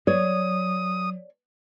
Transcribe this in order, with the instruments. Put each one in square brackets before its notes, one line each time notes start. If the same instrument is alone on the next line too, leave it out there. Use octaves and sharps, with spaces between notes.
[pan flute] F#3 [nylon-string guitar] C#5 D5 [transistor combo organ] D#6